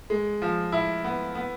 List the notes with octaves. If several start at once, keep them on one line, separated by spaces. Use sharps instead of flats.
G#3
F3
E4
B3
B3